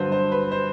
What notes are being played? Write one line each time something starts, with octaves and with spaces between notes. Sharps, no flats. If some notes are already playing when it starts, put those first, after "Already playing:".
Already playing: G2 D3 F#3 B4 C5
C5
B4
C5